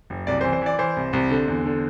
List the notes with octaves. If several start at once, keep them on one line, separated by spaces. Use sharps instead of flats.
F#1
C2 D5
C5
E3
C5
E3 D5
E3 C5
C2
C2
D3
E2
D3